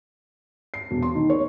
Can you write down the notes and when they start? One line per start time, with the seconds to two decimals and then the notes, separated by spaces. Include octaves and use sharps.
0.74 C7
0.91 E1
1.02 C6
1.15 D#3
1.30 C#5